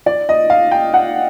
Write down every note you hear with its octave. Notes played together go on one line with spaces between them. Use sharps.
D5
D#5
F5
G5
F#5